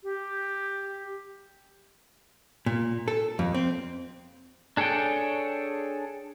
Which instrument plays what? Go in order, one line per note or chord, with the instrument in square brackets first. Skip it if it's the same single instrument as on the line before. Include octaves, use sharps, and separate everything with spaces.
[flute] G4
[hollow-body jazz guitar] A#2
A4
F2
C4
[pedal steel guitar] D4 G#4 A4 C#5 G5